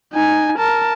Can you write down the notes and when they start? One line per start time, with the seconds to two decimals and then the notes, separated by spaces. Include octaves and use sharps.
0.13 D#4 G#5
0.59 A#4 A5